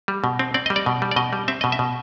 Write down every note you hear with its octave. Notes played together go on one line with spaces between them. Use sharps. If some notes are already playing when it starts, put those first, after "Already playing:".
G3
B2
C4
C4 D5
G3 D#5
D5
B2
G3
D5
B2 D#5
G3
C4 E5
B2 D#5
E5
B2